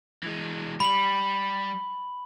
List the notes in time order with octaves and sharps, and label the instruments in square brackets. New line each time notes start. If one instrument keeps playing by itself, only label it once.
[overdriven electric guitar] E3 G#3
[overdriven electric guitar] G3 [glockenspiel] B5 F#7